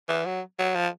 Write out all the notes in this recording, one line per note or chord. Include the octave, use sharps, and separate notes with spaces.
E3
F#3
F#3
F3